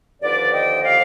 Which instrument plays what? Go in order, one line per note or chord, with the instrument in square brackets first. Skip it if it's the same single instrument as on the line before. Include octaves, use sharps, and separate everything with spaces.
[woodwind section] D#2 D3 F3 B4 D5
D#5 G5
D5 F5